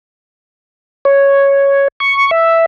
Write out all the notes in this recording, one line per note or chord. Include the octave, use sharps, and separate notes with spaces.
C#5
C#6
E5